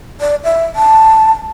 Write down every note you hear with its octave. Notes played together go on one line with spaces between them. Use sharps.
D5
E5
A5